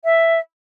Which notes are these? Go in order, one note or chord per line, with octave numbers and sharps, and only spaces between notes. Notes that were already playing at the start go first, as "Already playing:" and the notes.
E5